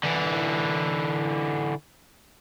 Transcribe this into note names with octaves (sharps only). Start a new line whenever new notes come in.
D3 E3